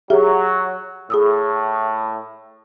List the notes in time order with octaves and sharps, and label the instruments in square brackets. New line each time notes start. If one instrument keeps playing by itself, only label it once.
[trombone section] F#3 [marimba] G4 G#4 E5
[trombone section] A2 [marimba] G#4 D#6 E6